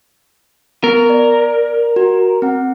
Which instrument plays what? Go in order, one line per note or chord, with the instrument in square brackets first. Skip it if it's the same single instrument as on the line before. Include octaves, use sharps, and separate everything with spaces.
[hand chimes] B3 [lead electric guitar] A#4
[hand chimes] D5
F#4
C4 F#5